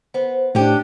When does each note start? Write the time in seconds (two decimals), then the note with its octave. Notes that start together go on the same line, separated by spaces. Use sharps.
0.14 B3 C5
0.55 A2 C#4 D4 G4